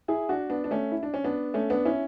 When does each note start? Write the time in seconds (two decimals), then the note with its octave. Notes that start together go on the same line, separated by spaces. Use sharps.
0.08 E4 G#4
0.29 D4 F#4
0.50 B3 D4
0.64 D4
0.71 A3 C#4
0.92 E4
1.03 D4
1.14 C#4
1.24 B3 D4
1.54 A3 C#4
1.70 B3 D4
1.85 C#4 E4